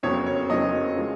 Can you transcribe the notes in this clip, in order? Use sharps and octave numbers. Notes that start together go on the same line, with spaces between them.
F#1 F2 C#3 F#3 B3 C#5
C#5
F#1 F2 C#3 F#3 B3 D#5
F3 G#3